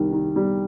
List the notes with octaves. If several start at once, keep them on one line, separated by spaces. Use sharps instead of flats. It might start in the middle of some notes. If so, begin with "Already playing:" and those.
Already playing: C2 D#3 G3
D#3
G3